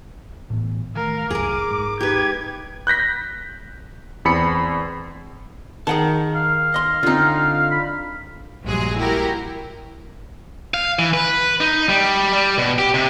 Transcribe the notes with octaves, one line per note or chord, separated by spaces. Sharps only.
A2 E3 B3
D#3 A3 A#4 F5
F1 C2 F#2 G#4 A#4 D6
G#2
D#4 G4 B4 G#6
F#6 G6 A#6 B6
E2 C4 B5 C#7
D#3 G#4 F#5 A5
F5
D#5 C6
D3 C4 D#4 F4
B5
A#1 G2 F#3 G#3 G#4
E4 F#4 G4 A#4
F5
E3
B4
D#4
G3
G3
B2
G4
C3